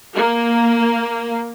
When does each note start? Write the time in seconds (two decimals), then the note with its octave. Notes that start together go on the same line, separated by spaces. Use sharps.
0.14 A#3